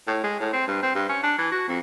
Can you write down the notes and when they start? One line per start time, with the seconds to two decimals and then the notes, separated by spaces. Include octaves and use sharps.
0.07 A2
0.24 G#3
0.40 A2
0.53 C4
0.68 G2
0.83 C4
0.95 G2
1.09 C#4
1.23 D4
1.39 E3
1.51 F#4
1.68 F2